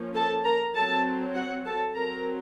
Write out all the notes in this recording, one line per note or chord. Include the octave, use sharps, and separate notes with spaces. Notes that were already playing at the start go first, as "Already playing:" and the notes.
Already playing: F3 A#3 C#4
A4 A5
A#4 A#5
F#3 C4 A4 A5
F#4 F#5
A4 A5
F#3 C4 A#4 A#5